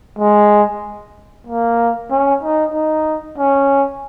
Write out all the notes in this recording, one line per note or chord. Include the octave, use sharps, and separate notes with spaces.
G#3
A#3
C#4
D#4
D#4
C#4